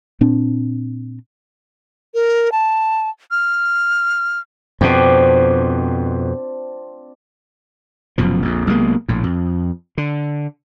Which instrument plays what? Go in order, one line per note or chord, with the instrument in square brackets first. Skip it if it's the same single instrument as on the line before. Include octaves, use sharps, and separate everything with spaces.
[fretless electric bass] A#2 C4 D4
[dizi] A#4
A5
F6
[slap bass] F2 B2 [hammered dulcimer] C4 D4 F4
[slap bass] F1 F#2 B2 F3
A#1 F2
B1 C3 G#3 A#3
A#1 A2
F2
D3